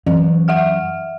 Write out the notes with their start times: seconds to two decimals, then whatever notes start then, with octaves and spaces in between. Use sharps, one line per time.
0.06 F#2 E3
0.48 E5 F#5 F6